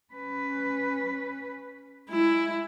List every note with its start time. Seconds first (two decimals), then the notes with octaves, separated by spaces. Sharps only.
0.13 C#4 B4
2.09 G#3 E4